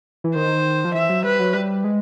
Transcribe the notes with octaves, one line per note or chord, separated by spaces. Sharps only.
E3
D#3 C5
F3
E3 E5
F#3
G3 B4
F#3
G3
G#3